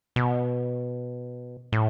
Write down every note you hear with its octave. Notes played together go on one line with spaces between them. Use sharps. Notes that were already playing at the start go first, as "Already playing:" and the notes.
B2
A2